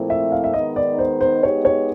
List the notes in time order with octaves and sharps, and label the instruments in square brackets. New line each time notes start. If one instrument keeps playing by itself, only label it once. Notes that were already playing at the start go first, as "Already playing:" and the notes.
Already playing: [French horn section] A#2 F3 A3 C4 E4
[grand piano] E5
F5
E5
[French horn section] D#3 G#3 B3 D#4 [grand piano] D#5
[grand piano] D5
C5
C5
[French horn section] G#3 B3 D#4 G4 [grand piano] C#5
[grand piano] C#5